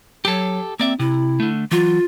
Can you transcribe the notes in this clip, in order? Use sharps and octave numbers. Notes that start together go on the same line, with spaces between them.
F#3 G4 A4
A#3 C4 D5 E5
C3 E4
D3 A3
E3 F#3 F4